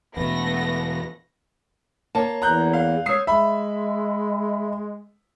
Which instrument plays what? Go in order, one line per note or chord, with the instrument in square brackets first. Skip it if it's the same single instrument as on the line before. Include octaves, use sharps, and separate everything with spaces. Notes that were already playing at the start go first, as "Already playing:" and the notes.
[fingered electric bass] E2 B2 [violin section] A3 B3 A#6
[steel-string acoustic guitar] A#3 C#5 [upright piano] A5
[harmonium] E2 [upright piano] A#5 F#6 G6
[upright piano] F5
[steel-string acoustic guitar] G#3 C#5 [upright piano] D#6 E6 C7
[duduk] G#3 [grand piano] E5 B5